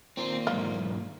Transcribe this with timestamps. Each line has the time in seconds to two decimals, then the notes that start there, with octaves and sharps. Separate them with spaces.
0.17 A#2 D#3 A#3 C4
0.47 B1 G#2 F4